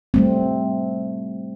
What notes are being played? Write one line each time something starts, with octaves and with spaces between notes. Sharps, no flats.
G3 A3 C4